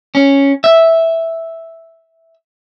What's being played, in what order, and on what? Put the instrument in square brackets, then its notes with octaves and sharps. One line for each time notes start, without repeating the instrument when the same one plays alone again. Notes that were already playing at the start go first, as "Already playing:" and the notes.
[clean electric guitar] C#4
E5